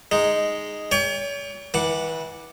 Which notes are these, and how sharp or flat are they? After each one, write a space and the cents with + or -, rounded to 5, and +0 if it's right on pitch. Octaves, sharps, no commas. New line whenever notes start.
G#3 +0 D#4 +0
C#5 +40 G5 +40 C#6 +40
E3 -30 F#5 +0 D6 +0